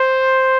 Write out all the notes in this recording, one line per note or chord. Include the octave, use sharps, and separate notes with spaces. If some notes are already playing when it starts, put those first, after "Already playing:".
Already playing: C5